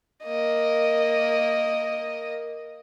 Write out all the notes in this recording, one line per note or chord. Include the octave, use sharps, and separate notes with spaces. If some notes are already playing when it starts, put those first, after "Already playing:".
A#3 D#5